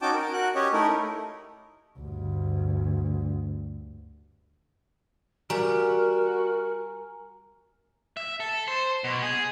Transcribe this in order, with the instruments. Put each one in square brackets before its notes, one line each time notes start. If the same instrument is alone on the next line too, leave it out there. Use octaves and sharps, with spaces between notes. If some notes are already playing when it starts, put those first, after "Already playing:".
[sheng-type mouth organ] C#4 D#4 F#4 G5 A5 D6
A#4
F#4 F#6
C#4 G4 C#5 D#5
A3 D#4 E4 A#4
[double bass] D2 G2
[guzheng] G3 [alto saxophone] F#4 [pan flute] A#4 [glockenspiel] G#5 A#5
[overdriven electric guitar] E5
A4
C5
B2
G#4